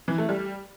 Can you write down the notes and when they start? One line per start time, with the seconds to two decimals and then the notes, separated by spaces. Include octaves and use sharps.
0.08 E3
0.18 A3
0.29 G3